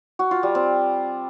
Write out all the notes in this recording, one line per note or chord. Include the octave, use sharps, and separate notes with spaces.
F#4
F4
G3
C4